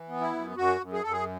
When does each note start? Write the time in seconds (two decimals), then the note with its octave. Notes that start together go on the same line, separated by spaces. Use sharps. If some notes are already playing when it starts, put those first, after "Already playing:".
Already playing: E3
0.09 B3
0.21 E4
0.32 F#2
0.57 F#2 F#4
0.81 F#2
0.93 G#4
1.03 F#2 A4
1.13 G#4